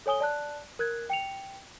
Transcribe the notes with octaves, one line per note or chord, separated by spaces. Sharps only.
A4 C#5 G#5 D#6 G7
D5 A5 F#6
A#4 F#6 G#6
G5 C#7 F7